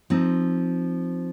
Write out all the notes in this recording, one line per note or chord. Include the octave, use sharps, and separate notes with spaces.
F3 C4 D#4